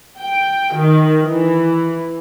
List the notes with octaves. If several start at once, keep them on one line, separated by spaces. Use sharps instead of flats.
G5
D#3
E3